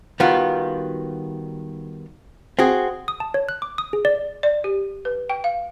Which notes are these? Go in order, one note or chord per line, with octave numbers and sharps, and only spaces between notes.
D#3 G3 B3 F4 F#4
C4 F#4 G#4
D#6
A5
C#5
F#6
D6
D#6
G#4
D5
D5
G4
B4
G5
F5